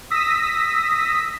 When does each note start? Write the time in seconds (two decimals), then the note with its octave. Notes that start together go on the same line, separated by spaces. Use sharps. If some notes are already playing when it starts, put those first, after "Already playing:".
0.10 D#6 E6 A#6 B6